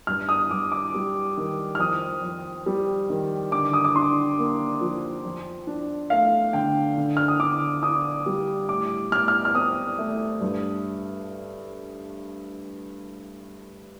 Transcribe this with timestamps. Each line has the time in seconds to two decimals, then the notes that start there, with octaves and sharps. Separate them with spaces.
0.07 G2 F6
0.29 D#6
0.51 G2 D6
0.72 D6
0.94 G3
1.37 D#3
1.75 F6
1.80 F2 D#6
2.23 F2
2.66 G3
3.10 D#3
3.52 D3 D6
3.73 D#6
3.85 D6
3.95 D4 C6
4.38 A#3
4.81 F3
5.25 F2
5.67 D4
6.10 A3 F5
6.53 D3 G5
6.97 D3
7.17 F6
7.28 D#6
7.40 D3 D6
7.83 D4 D#6
8.26 G3
8.69 A2 D6
9.12 A2 F6
9.28 F6
9.45 F6
9.55 C4 D#6
9.99 A3
10.41 G2